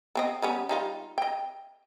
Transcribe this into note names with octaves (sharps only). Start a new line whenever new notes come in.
B3 C4 D#5
G3 B3 C#4
G3 D#4 F4
D#5 G5